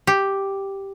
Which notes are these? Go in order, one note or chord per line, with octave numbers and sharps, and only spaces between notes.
G4